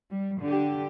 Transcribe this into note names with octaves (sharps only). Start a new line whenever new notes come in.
G3
D3 G4